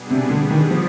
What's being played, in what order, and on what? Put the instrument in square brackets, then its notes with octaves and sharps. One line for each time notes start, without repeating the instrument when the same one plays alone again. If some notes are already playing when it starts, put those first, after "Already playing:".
Already playing: [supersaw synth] B2 G3 B3 D4 G#4
[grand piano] C3
D3
D#3
F3